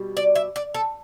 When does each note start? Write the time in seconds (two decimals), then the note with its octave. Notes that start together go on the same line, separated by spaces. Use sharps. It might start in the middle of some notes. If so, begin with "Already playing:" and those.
Already playing: B2 G3
0.17 D5
0.35 E5
0.56 D5
0.75 A4